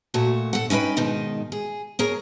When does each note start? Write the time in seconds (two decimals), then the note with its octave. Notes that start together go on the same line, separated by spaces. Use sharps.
0.14 A#2 A3 F#4
0.53 A4 F#5
0.70 C#4 D#4 E4 B4 G5
0.97 G#2 B2 D#3 D#4
1.52 G#4
1.99 G#4 A#4 C#5 A#5